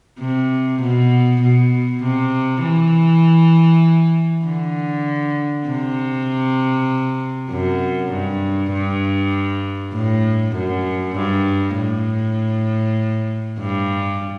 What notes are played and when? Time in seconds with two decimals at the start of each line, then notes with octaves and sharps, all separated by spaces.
0.20 C3
0.81 B2
1.41 B2
2.03 C3
2.63 E3
4.46 D3
5.68 C3
7.50 F#2
8.12 G2
8.72 G2
9.94 A2
10.55 F#2
11.16 G2
11.76 A2
13.60 G2